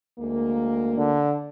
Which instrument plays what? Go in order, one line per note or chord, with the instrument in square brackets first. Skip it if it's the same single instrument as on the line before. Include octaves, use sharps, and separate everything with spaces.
[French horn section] D2 G#3 A#3
[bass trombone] D3